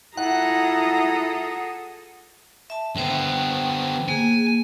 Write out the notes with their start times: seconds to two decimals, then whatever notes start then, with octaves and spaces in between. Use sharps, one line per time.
0.17 E4 F4 G#4 A4 F#5 A#5
2.70 E5 A5
2.96 D3 B3 C5 G5
4.09 A#3 G#4 G#5